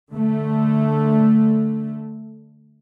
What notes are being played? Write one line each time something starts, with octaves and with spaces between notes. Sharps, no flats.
D3 A3